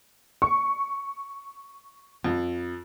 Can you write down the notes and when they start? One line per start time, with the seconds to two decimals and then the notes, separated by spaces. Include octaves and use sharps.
0.42 C#6
2.24 F2